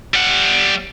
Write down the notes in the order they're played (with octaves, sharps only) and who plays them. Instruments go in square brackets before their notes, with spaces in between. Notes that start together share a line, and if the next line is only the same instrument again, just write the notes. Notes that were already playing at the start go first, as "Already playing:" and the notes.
[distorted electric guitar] G3 F#5